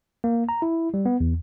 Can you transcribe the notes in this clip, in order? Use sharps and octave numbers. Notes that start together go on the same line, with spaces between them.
A#3
A#5
E4
G3
B3
E2